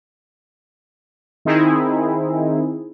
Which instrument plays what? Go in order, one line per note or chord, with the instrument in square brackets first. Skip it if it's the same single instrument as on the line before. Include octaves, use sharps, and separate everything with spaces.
[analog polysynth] D#3 C4 D#4 E4 G#4